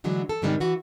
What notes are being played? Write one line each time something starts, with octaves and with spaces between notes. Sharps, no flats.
D3 E3 F#3 G#3 D4
A4
G#2 C3 D#3 G3 G#3 D4
E3 F#4